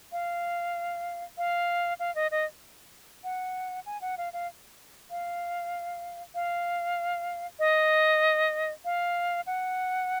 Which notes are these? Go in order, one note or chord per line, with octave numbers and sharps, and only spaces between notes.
F5
F5
F5
D#5
D#5
F#5
G#5
F#5
F5
F5
F5
F5
D#5
F5
F#5